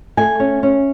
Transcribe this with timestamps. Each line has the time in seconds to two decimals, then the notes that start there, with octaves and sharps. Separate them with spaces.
0.17 A3 G#5
0.40 C#4
0.63 C#4